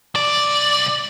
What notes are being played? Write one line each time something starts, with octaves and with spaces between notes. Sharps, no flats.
C2 D5